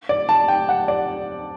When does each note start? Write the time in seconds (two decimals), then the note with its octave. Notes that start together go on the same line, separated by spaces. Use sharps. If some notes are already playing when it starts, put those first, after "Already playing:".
0.09 D5
0.29 A5
0.48 G5
0.69 F#5
0.88 D5